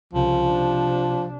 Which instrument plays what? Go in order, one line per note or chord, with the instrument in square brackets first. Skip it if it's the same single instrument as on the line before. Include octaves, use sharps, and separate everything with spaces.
[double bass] C2 C#3 [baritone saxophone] F3
[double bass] C3 D4